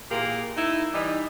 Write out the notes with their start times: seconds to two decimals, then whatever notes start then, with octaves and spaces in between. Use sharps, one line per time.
0.11 A#2 E3 A#3 G4 G#4
0.55 D#4 E4
0.93 E3 G3 D#4